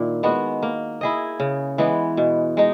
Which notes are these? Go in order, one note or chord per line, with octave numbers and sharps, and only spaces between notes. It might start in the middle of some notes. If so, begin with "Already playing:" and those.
Already playing: A#2 D#3 E4
G#3 B3 F#4
A#3
E4 G#4 D#5
C#3
E3 G#3 B3
B2
G#3 D#4